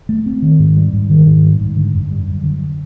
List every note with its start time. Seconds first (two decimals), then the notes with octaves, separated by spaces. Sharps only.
0.09 A3
0.26 C4
0.42 D#3
0.59 G#2
0.77 G3
0.93 G#2
1.10 D#3
1.26 G#2
1.43 G3
1.61 G#2
1.76 D3
1.94 F#2
2.11 G3
2.28 F#2
2.44 D3